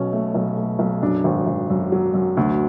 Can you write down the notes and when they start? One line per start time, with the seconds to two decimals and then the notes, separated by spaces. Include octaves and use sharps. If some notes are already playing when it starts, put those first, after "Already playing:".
Already playing: B1 B2 C#4
0.13 A3
0.35 B1
0.57 A3
0.79 B1
1.03 F#2 D4
1.24 G#1
1.46 G#1
1.70 F#2
1.92 F#3
2.14 F#2
2.37 D2